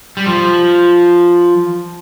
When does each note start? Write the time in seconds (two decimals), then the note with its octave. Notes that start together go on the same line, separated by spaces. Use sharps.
0.17 G3
0.26 F3